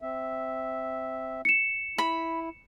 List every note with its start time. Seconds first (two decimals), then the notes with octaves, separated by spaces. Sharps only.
0.02 C4 E5
1.45 C#7 E7
1.98 E4 B5